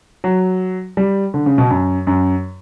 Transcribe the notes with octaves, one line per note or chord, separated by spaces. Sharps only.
F#3
G3
D3
C#3
B2
F#2
F#2